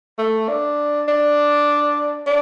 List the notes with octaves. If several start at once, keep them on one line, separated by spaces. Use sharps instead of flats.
A3
D4
D4
D4